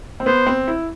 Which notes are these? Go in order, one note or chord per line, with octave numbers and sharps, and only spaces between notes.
C4
B3 C5
C4
E4